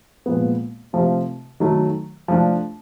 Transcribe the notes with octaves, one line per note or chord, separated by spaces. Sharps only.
A#2 F3 G#3 B3
C3 F3 A3 C4
D#3 F#3 A3
F3 A3 D4